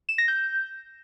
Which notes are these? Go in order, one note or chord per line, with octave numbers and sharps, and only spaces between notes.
E7
A#6
G6